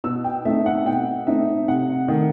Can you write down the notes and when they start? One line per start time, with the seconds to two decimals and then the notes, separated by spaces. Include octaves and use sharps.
0.04 B2 E6
0.24 G5
0.45 A3 C4 D#4 E5
0.66 F#5
0.85 B2 G5
1.27 A3 C4 D#4 E5
1.68 C3 F#5
2.08 D#3 A3